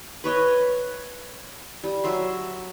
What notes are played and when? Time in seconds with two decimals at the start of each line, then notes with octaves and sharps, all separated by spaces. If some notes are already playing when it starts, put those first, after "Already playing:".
0.24 B4 C#5 D#5
1.84 G3
2.04 F#3 E5 C6